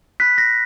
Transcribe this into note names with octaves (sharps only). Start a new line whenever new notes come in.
B5 F#6 B6
A#6